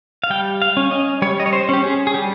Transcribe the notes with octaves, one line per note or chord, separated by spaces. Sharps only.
F5
G3 G5
F5
C#4
D#5
G3 C#5
D#5
C#5
C5
C#4 G4
G#4
G#4
G3 G4